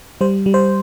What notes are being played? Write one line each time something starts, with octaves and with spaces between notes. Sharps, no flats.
G3 C5
G3
C5